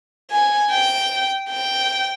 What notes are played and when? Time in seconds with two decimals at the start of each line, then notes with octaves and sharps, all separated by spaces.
0.31 G#5
0.71 G5
1.49 G5